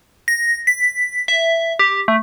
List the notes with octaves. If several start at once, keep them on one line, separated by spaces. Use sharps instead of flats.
A#6
B6
E5
G4
A3